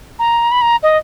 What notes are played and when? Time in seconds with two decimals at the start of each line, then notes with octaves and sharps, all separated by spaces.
0.19 A#5
0.51 B5
0.61 A#5
0.83 D#5